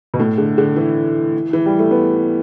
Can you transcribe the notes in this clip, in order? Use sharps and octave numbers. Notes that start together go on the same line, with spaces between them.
B2
A2
D3
D3
E3
E3
G3
A3
B3